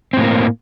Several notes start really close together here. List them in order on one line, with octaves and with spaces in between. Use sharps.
C4 A2 A#3